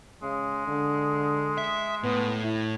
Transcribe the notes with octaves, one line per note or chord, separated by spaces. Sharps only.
C#3 G#3
D3
E5
A2 B3
E4